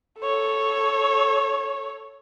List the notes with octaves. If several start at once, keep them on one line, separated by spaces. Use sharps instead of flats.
A4 C#5